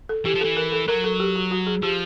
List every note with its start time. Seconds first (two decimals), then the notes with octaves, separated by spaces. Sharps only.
0.09 A4
0.25 E3 G4
0.35 F3
0.41 E3 A4
0.57 A#4
0.72 A4
0.88 F#3 A#4
1.04 A4
1.20 G4
1.35 F#4
1.51 F#4
1.67 G#4
1.82 F3 G4